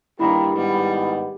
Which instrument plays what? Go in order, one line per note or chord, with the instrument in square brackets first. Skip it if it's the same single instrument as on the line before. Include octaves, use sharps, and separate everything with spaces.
[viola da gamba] G2 D3 D#3 [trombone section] G3 A#3 G4 [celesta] E4 B5
[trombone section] G#2 D#3 B3 [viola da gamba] G3